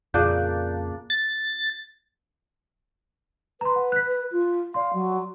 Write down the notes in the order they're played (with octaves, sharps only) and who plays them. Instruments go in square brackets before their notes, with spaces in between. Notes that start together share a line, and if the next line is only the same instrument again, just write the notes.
[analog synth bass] F2 [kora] A#2 C#3 A#3 [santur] D4 [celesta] D5 F#6 G6
[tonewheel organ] A6
[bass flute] B4 [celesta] A#5 C6
[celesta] F#5
F#6 B6
[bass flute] F4
[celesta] D5 C6 [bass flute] F5
[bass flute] F#3